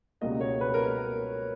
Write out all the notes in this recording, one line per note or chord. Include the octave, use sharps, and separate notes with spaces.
C#2 B2 G3 A#3 D#5
C#5
B4
A#4
A#4